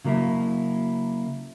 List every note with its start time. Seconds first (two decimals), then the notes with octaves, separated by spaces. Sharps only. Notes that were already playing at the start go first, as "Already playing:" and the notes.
0.05 C#3 F#3 A#3 E4